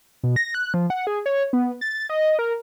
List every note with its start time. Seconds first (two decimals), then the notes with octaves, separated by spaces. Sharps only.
0.23 B2
0.36 A#6
0.55 F#6
0.74 F3
0.90 F#5
1.07 G#4
1.26 C#5
1.53 B3
1.81 A6
2.10 D#5
2.39 A#4